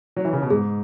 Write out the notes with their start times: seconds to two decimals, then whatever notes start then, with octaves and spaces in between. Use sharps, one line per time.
0.16 F#3
0.25 E3
0.33 C#3
0.42 B2
0.50 G#2 G#4